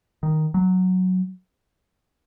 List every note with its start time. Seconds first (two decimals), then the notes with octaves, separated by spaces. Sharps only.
0.23 D#3
0.54 F#3